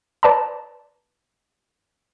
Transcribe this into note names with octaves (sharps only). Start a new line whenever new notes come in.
B4 D5 A5 A#5